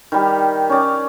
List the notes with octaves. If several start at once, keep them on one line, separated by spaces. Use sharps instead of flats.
D#3 G3 G4
C#4 D5